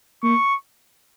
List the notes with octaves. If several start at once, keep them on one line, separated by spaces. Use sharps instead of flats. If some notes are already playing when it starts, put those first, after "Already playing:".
A#3 C#6